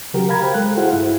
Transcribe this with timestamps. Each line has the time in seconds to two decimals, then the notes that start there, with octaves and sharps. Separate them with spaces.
0.14 C#3 F#3 F#4 G4 A#4
0.29 F5 A#5 B5 G#6
0.42 C5 F5 G5
0.54 G#3 A4 F#6
0.77 E4 F#4 G#4 C5 F5 F#5
0.93 G2 E4